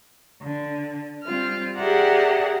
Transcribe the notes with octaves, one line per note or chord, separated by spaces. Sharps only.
D3
G3 C4 F4 F6
G4 G#4 A#4 D5 E5 F#5